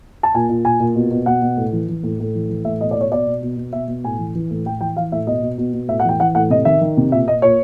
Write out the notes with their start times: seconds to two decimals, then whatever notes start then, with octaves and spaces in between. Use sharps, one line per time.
0.23 A5
0.34 A#2 G#5
0.49 A#2
0.65 A#2 G#5
0.80 A#2
0.96 B2
1.11 B2
1.26 B2 F#5
1.42 B2
1.57 A2
1.73 E3
1.89 E3
2.03 A2
2.20 A2
2.35 E3
2.49 E3
2.65 A2 E5
2.81 B2 D#5
2.91 D5
2.96 B2 C#5
3.12 B2 D5
3.27 B2
3.42 B2
3.57 B2
3.73 B2 E5
3.88 B2
4.04 A2 G#5
4.19 E3
4.35 E3
4.50 A2
4.66 A2 G5
4.80 E3 G5
4.97 E3 F5
5.12 A2 E5
5.27 B2 D#5
5.42 B2
5.58 B2
5.74 B2
5.88 A2 E5
6.00 F#5
6.05 E3 G5
6.20 E3 F#5
6.35 A2 F#5
6.50 C3 D#5
6.65 D#3 E5
6.81 D#3
6.97 C3
7.12 A#2 E5
7.28 A#2 D#5
7.42 A#2 C#5